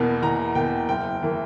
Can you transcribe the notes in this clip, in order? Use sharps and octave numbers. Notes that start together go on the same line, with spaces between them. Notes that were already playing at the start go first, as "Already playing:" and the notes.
Already playing: E2 B2 A#3
E2 A#5
B2 A#3 G5
F#1 G5
E3 A#3